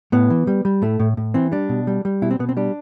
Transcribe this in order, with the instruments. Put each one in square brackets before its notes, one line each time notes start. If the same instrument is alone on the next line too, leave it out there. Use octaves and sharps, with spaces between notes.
[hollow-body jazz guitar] A2 B3
E3
G3
G3
A2 A3
A2
A2
E3 C4
G3 D4
B2
G3
G3
B2 E4
C4
B2 B3
C4
G3 D4